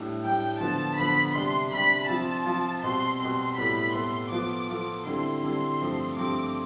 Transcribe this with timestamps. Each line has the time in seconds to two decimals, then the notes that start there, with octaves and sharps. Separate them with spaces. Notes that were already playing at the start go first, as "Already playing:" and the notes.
Already playing: A2 G3 D4
0.23 A2 G3 D4 G5
0.61 D3 F3 B3 A5
0.97 D3 F3 B3 B5
1.35 C3 G3 D4 C6
1.72 C3 G3 D4 B5
2.09 F3 C4 F4 A5
2.46 F3 C4 F4
2.83 B2 G3 C4 C6
3.20 B2 G3 C4 C6
3.57 A2 G3 B3 E4 A4 B5
3.94 A2 G3 B3 E4 A4 C6
4.31 F3 B3 F4 A4 D6
4.68 F3 B3 F4 A4
5.06 D3 G3 C4 E4 A4 C6
5.42 D3 G3 C4 E4 A4 C6
5.79 G2 F3 A3 C4 G4
6.17 G2 F3 A3 C4 G4 D6